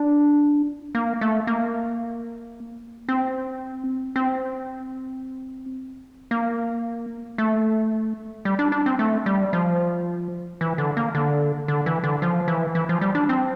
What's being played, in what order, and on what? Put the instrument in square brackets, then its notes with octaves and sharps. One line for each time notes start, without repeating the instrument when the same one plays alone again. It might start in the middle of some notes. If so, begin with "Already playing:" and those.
Already playing: [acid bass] D4
A#3
A3
A#3
C4
C4
A#3
A3
G3
D4
D4
C4
A3
G3
F3
E3
D3
A#3
D3
D3
E3
D3
F3
E3
E3
F3
G3
D4
C4